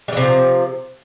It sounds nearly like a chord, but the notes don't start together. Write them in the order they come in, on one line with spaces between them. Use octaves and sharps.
G3 E3 C3 F3